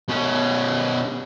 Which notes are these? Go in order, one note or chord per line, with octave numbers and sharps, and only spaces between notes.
B2 C#4